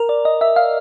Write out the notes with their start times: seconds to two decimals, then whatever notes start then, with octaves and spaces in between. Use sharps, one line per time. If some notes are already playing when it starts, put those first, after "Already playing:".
Already playing: A#4
0.09 D5
0.25 D#5
0.41 E5
0.56 F5